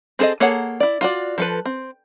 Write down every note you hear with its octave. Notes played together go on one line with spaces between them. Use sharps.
C4 G#4 A4 B4 D#5
A#3 G#4 A4 C#5 F#5
E4 D5
F4 F#4 D5
F3 A4 B4
C4